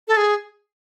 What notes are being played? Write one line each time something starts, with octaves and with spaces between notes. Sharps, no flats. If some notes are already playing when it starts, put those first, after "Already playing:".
A4
G#4